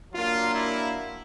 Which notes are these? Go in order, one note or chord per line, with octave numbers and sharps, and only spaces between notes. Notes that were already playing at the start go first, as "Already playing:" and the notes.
F#3 A#3 D4 F4
E4